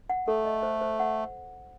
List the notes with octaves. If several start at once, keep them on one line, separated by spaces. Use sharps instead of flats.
F#5
A3 A4
D#5
C5
C5
F#5